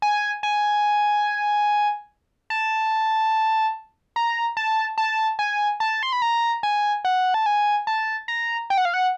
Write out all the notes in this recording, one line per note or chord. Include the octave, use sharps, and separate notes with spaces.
G#5
G#5
A5
A#5
A5
A5
G#5
A5
C6
B5
A#5
G#5
F#5
A5
G#5
A5
A#5
G5
F#5
F5
F#5